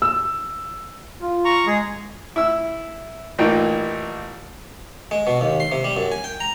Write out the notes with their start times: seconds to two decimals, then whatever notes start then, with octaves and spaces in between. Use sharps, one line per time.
0.02 E6
1.21 F4
1.45 A#5 C#6
1.67 G#3 G#4
2.36 E4 E6
3.39 A1 A#2 E3 A#3 D#4 G5
5.11 G#3
5.27 B2
5.41 D#2
5.60 C6
5.72 C3
5.84 G3
5.97 F#2
6.12 G#5
6.24 G5
6.40 A#5